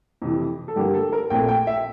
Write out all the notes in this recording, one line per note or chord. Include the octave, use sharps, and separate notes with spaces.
F2 C3 E3
A4
G2 D3 G3 A#3 G4
A4
A#4
A#1 A#2 A3 C4 G5
G5
E5